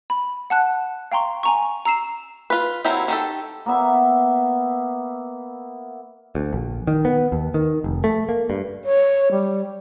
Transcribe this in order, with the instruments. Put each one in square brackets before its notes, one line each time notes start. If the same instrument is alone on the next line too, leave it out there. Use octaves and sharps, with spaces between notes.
[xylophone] B5
F#5 A5 F#6
F5 G5 A#5 C6 C#6
G#5 A#5 C#6
A#5 E6 C7 E7
[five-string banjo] F4 B4
F#3 A#3 C4 E4 G4
D#3 G4 A4
[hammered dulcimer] A#3 B3 E5
[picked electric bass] D2
A#1
D#3
B3
D#2
D#3
F1
A3
A#3
G2
[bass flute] C#5
G3